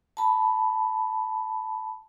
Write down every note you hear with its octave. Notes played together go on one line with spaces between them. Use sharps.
A5 B5